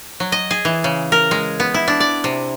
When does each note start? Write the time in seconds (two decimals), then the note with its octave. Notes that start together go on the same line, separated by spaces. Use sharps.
0.20 F#3
0.32 D#5
0.51 G#4
0.65 E3
0.84 C#3
1.12 A#4
1.31 G#3
1.60 B3
1.74 E4
1.88 D4
2.00 D5
2.24 C3